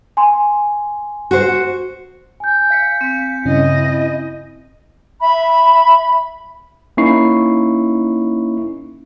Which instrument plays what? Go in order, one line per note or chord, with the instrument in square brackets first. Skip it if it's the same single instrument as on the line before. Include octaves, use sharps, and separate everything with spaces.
[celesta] G#5 C6
[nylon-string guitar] F#4 C5
[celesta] G#5 G6
[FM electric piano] F5 B6 C#7
[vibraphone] C4
[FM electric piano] G2 C#3 C#4 [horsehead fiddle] E4 D#5
[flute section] E5 B5
[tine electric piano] A#3 C#4 D#4 E4 C#6 C7